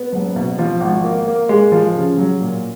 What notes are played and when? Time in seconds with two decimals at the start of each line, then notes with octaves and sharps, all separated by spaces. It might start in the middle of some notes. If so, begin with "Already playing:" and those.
Already playing: B3
0.13 F#1
0.36 B2
0.59 F3
0.81 G#1
1.04 A#3
1.27 A#3
1.49 G#3
1.72 F3
1.95 C#3
2.18 F#3
2.41 A#2